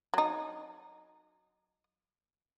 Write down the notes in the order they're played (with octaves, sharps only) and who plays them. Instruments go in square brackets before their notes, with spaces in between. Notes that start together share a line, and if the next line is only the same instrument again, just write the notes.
[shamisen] F#3 D#4